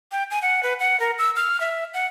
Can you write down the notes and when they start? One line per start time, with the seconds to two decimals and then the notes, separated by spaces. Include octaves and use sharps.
0.12 G5
0.31 G#5
0.42 F#5
0.63 B4
0.80 F#5
1.00 A#4
1.18 E6
1.36 F6
1.60 E5
1.94 F#5